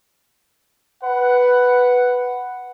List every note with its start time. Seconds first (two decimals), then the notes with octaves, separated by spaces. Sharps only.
1.01 B4 F#5